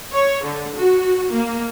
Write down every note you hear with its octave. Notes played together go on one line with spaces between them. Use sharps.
C#5
D3
F#4
A#3